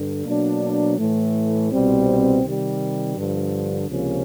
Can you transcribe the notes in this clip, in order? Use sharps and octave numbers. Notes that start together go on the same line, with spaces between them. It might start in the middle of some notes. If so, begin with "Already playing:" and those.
Already playing: G2 D3 G3
B2 F#3 A#3 D4
A2 E3 A3
C2 B2 G3 C4
C3 D#3 G3
G2 D3 F3
C#2 C3 F3 A#3 C#4